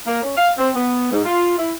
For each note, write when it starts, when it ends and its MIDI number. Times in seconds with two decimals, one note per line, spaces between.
0.06 0.21 58
0.23 0.36 61
0.37 0.51 77
0.58 0.71 60
0.76 1.11 59
1.12 1.22 44
1.25 1.55 65
1.58 1.73 64